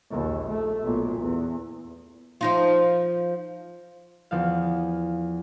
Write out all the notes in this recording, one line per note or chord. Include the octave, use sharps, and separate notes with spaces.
A#1 D#2
A3
B1 A#2
E2
F3 D#4 F4
E2 F3 F5